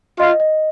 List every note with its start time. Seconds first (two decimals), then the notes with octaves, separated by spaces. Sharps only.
0.19 F4 D#5
0.40 D#5